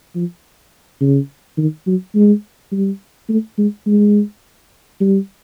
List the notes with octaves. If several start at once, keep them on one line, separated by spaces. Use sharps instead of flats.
F3
C#3
D#3
F#3
G#3
G3
A3
G#3
G#3
G3